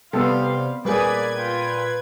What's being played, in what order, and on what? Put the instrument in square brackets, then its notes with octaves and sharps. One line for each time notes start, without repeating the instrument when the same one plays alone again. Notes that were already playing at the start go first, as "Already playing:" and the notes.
[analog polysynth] C3 G3 [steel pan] B3 A4 [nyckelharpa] F5 C6
[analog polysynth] A#2 B4 G#6 [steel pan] G3 G#4 [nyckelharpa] A#3 D5
[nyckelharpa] F4 G5